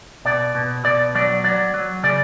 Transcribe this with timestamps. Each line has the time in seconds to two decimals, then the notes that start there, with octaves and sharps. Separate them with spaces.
0.25 B2 D5
0.55 B2
0.84 B2 D5
1.15 F#3 D5
1.44 F#3 D5
1.74 F#3
2.03 C#3 D5